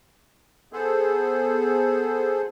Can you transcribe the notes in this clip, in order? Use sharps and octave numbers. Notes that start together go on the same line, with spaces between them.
B3 G#4 A4 C5